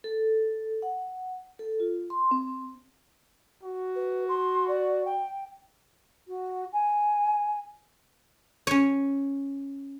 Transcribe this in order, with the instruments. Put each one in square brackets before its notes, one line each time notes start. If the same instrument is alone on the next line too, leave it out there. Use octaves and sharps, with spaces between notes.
[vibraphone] A4
F#5
A4
F4
C6
C4
[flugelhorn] F#4
[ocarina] B4
C6
D5
G5
[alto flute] F#4
G#5
[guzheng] C#4 C#5